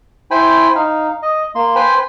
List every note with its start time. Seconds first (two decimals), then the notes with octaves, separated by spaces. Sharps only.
0.31 E4 C5 G5 G#5 B5
0.76 D#4 F5
1.22 D#5
1.55 A#3 C6
1.76 B4 C5 G5 G#5 B5